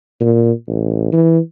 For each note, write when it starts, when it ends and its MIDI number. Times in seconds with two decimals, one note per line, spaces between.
0.20 0.52 46
0.68 1.11 33
1.12 1.39 52